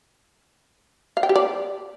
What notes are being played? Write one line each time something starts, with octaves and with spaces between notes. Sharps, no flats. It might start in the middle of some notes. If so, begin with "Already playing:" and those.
F5
G5
G4
D5